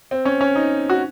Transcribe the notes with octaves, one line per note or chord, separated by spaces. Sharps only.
C4
C#4
C#4
D#4
F#4